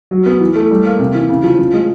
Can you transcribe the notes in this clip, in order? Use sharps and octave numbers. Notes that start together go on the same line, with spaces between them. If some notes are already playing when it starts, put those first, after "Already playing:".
F#3
B3
E3
A3
G3
A#3
C3
E3
C#3
F3
F3
G#3